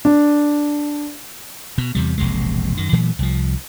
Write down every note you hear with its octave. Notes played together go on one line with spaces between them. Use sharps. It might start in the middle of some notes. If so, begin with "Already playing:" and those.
D4
B2
E2 C3 G3
E1 A#1 C3 G#3
F#2 D#3
A#2 E3 F#3 A3
C2 F3